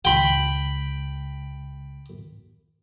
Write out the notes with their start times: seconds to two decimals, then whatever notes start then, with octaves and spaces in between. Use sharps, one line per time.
0.05 C#2 G5 B5